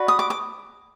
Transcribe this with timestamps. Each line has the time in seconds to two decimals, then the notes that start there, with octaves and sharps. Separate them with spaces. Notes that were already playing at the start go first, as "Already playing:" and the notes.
Already playing: F#4 B4 D5
0.08 D#6
0.19 D6
0.30 D6